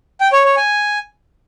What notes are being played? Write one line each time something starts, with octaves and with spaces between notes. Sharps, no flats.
G5
C#5
C#5
G#5